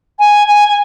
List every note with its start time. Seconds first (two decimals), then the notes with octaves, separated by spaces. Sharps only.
0.19 G#5
0.47 G#5
0.68 G#5